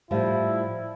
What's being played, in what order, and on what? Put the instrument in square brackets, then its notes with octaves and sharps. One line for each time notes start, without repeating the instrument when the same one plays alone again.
[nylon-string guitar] A2 F3 G3 [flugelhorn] E4